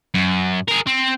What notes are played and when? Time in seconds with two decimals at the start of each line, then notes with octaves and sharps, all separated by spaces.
0.14 F#2
0.68 G#4 A#4
0.87 C4